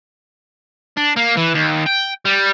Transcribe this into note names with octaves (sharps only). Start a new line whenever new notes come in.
D4
A#3
E3
D#2
G5
G3